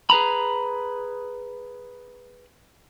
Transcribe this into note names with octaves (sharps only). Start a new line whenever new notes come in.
G#4 B4 A#5 B5